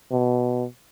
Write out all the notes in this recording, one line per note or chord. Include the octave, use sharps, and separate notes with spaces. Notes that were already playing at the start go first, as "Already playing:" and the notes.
B2